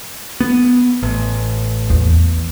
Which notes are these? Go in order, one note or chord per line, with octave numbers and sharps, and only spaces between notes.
B3
A1
E2